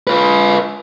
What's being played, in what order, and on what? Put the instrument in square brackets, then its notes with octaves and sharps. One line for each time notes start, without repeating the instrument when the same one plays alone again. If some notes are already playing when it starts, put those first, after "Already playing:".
[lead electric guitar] F4 B4